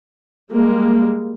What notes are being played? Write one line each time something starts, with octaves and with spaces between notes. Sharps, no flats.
G3 G#3 A#3